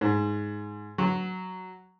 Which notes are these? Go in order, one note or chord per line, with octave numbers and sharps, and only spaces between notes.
G#2
F#3